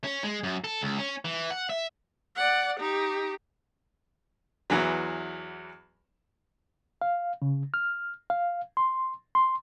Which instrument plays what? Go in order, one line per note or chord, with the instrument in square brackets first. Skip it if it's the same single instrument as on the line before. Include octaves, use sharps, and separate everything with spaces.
[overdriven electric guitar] C#4
G#3
F#2
A4
C#2
C#4
E3
F#5
E5
[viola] D5 F#5
D#4 G4
[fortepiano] E2 E3 F#3
[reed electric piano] F5
C#3
F6
F5
C6
C6